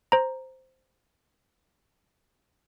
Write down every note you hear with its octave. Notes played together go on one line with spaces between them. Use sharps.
C5 A#5